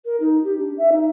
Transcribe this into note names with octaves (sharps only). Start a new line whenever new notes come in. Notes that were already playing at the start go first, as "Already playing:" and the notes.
A#4
D#4
G4
D4
E5
D#4